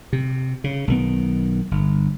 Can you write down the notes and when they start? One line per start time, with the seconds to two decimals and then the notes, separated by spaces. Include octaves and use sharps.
0.13 C3
0.64 C#3
0.88 B1 D#3 B3
1.71 G1